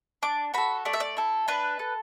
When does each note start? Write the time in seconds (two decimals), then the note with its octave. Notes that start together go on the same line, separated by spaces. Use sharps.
0.22 D4 D6
0.54 F#4 A4 B5
0.85 A3 D5
0.93 E5
1.00 D5
1.17 E4 A4
1.48 D4 B4
1.79 A4